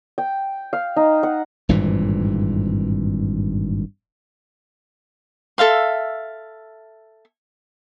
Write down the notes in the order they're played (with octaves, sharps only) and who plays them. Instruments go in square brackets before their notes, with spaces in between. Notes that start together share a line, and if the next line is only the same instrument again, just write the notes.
[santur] G5
F5
D#4
F#5
[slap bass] G#1 G2 A#2 E3
[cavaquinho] A4 E5 F5 C6